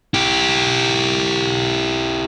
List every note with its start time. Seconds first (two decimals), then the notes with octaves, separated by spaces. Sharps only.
0.14 E4 G4